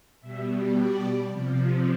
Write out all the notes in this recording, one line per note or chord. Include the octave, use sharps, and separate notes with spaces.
B2 G3 E5
D5
C3 F3